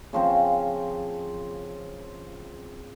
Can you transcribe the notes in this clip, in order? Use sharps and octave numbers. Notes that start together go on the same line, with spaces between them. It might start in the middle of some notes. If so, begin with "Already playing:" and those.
C#3 F3 C4